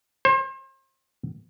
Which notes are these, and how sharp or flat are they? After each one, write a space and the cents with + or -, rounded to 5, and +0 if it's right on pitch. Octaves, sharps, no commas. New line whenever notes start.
C5 +35